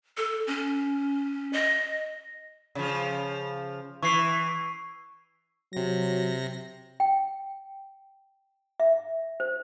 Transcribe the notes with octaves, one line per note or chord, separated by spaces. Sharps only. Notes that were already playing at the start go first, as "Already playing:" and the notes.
A4
C#4
D#5
C#3 F3
E3 C#6 C7
C3 F#3 A#6
G5
E5
C5